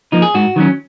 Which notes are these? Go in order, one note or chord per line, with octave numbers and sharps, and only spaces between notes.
F3 A#3 D#4
G#4
G#2 F#4
D#3 F#3 C#4